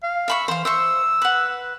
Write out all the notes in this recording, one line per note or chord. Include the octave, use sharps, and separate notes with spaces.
F5
E5 B5 C#6
E3 C5 F5
C5 E5 C#6 E6
B4 F#5